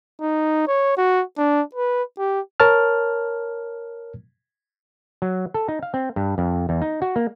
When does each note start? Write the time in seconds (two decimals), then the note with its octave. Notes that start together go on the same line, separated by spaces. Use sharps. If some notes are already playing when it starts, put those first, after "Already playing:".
0.21 D#4
0.68 C#5
0.98 F#4
1.38 D4
1.75 B4
2.19 G4
2.60 A#4 C#5 A5 F6
5.22 F#3
5.54 A4
5.69 D#4
5.83 F5
5.94 C4
6.16 G2
6.38 F2
6.69 E2
6.82 D#4
7.02 F#4
7.16 A#3